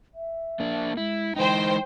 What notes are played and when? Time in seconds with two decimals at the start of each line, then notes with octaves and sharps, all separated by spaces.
0.14 E5
0.60 A#3 D4
0.97 G#3 E4
1.36 E3 G#3 D#4 C5 G5